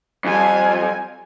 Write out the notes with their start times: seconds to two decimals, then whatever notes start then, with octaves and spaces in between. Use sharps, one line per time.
0.25 F2 G3 G#5